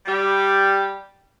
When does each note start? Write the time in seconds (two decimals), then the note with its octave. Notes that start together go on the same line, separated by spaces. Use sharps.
0.06 G3 G4